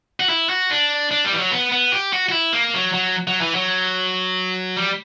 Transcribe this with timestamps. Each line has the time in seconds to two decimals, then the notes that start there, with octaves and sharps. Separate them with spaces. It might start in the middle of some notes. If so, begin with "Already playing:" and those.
0.20 F#4
0.29 E4
0.49 F#4
0.71 D4
1.11 D4
1.25 G3
1.33 E3
1.37 F#3
1.52 B3
1.72 B3
1.92 G4
2.13 F#4
2.29 F#4
2.32 E4
2.53 A#3
2.74 F#3
2.94 F#3
3.27 F#3
3.41 E3
3.55 F#3
4.77 G3